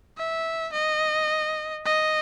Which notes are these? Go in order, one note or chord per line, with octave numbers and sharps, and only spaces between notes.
E5
D#5
D#5